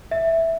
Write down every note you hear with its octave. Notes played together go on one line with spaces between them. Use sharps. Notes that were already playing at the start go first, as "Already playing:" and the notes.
E5